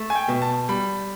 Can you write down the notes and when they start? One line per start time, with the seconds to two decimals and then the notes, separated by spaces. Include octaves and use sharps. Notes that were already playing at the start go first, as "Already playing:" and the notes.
Already playing: A3
0.10 G#5
0.15 G5
0.29 B2
0.42 A5
0.69 G3 B5